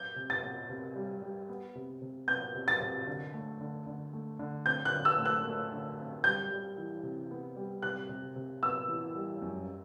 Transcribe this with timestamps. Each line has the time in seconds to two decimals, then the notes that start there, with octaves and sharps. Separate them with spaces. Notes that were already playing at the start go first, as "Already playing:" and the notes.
Already playing: G6
0.16 C3
0.30 A6
0.43 B3
0.69 C3
0.96 G3
1.22 G3
1.49 B3
1.75 C3
2.02 C3
2.28 B3 G6
2.55 C3
2.68 A6
2.81 C3
3.07 D3
3.34 A3
3.61 D3
3.86 D3
4.13 A3
4.39 D3
4.66 C4 G6
4.85 F#6
4.93 D3
5.05 E6
5.18 A3
5.25 F#6
5.45 A3
5.72 D3
5.99 C4
6.24 G3 G6
6.50 G3
6.78 E3
7.03 C3
7.31 B3
7.56 G3
7.82 C3 F#6
8.09 C3
8.36 C3
8.63 B3 E6
8.88 E3
9.15 G3
9.42 F#2